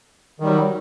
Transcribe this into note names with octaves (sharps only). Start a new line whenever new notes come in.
D#3 F#3 G3